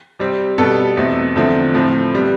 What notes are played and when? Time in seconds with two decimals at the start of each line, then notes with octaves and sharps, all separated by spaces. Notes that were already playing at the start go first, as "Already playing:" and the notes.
0.19 C3 G3 C4
0.58 B2 G3 B3 A4
0.97 E2 B2 A3 C4
1.35 E2 D3 F3 A3 C4
1.74 A2 F3 A3 C4
2.12 C3 G3 B3